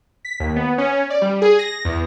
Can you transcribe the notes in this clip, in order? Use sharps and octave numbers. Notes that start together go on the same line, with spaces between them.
B6
D#2
B3
C#4
D5
G3
G#4
A#6
E2